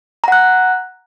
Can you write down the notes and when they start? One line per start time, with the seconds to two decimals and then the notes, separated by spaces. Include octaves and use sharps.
0.24 A#5
0.28 F#5
0.32 F#6